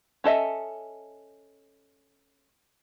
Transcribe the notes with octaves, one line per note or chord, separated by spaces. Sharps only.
C#4 A4 D#5 E5